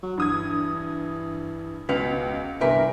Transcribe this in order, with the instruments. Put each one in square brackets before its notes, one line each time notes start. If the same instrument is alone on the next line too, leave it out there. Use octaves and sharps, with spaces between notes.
[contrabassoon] F#3
[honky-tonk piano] G2 D#6 G#6 [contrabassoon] E3
[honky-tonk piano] C#2 [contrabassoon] B2 [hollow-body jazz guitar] B4 F5 F#5
[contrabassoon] G1 [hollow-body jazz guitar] C2 G4 B4 [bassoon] E3 [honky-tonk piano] A#4